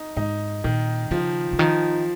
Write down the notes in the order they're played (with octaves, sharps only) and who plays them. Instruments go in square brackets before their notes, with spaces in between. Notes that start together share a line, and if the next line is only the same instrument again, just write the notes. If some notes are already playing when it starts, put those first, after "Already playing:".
Already playing: [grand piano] D#4
[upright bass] G#2 [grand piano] D#4
[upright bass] A#2 [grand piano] D#3
[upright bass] C#3 [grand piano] F3
[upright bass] C#3
[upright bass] D#3 [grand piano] F3